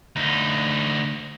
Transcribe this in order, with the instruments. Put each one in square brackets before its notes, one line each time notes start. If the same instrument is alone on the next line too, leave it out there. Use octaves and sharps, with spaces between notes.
[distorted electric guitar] D2 D#4